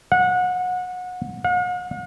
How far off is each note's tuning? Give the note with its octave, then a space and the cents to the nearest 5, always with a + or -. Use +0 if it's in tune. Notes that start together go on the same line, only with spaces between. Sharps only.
F#5 -25
F#5 -45